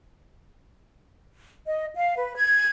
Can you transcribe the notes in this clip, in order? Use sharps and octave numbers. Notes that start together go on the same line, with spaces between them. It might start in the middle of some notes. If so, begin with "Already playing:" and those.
D#5
F5
B4
G#6